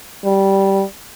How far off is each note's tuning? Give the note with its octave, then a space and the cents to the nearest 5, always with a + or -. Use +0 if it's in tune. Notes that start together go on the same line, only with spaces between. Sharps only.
G3 -10